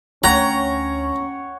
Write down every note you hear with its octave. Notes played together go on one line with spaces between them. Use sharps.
D2 C#4 C#5 F#5 G5 A#5